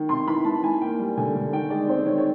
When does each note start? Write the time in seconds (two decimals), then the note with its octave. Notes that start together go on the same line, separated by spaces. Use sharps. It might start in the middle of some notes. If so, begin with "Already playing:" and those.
Already playing: D#3
0.09 C3 C6
0.27 E3 B5
0.44 E3 A5
0.63 E3 G#5
0.81 A#3 G5
0.99 G3
1.17 D3 G#5
1.35 D3
1.52 D#3 G5
1.70 G#3 D5
1.89 C4 C5
2.06 D#3 C#5
2.18 C#5